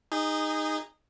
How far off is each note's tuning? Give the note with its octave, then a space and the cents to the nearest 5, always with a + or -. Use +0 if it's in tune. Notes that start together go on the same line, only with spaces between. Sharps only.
D#4 -5 G#4 -25